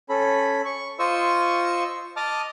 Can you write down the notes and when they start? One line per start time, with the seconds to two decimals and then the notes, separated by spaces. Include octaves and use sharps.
0.09 C#4 A4 B5
0.65 C#6
0.99 F4 C5 D#5 C#6 E6
2.16 D#5 A5 D6 D#6 F6